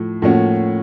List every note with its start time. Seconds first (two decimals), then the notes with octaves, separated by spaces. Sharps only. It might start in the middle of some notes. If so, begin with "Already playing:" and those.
Already playing: A2 F3
0.22 A2 F3 A#3 C#4 F#4